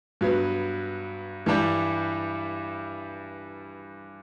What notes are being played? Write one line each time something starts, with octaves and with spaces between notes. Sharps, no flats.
G2 F#3 B3
G2 E3 G3 D4